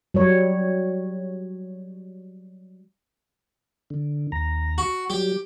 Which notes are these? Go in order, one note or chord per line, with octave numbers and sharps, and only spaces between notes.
F#3 G3 C#5
D3
D#2 A#5
F#4
F#3 G3 G4